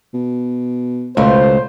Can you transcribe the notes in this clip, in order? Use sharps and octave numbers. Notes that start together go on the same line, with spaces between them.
B2
C#2 B2 A3 F4 C5